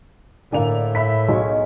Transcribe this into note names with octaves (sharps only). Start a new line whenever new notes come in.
A2 D3 A#3 D5 G#5 F7
E5 B5 B6
B1 F#3 G#3 D#4 C#5